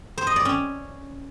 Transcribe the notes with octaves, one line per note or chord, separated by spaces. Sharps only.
C5
D#5
D5
C#4